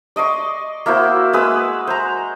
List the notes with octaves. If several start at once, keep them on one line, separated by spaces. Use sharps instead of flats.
D5 D#5 C6 C#6
A#3 E4 F#4 C5
G#3 B4 D#6 E6
C5 A#5